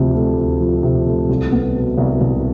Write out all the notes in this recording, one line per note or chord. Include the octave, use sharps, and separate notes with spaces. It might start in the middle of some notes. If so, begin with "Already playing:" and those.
Already playing: D2 C3 F3
A3
D2
F3
C3
A3
C2
B3
B2
C2
C2